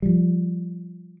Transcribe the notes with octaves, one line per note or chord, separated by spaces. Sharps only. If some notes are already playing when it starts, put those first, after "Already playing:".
F3 G3